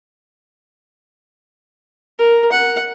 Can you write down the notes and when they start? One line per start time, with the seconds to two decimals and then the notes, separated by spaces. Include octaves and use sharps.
2.18 A#4
2.52 F#5